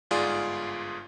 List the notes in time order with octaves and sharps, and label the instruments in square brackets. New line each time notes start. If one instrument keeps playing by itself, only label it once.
[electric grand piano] G1 G#2 F4 G#4 D5 C6